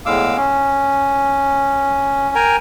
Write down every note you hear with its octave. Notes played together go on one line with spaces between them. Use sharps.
E2 A2 G#3 F5 D6 E6
C#4
A#4 G5 G#5 A#5